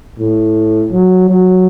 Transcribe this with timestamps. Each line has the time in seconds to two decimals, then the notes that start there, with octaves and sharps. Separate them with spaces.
0.19 A2
0.93 F#3
1.29 F#3